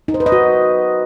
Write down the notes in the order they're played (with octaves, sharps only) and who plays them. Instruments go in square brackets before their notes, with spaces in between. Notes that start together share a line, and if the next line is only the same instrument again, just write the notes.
[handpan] D#4
C5
B4
D#5
F#4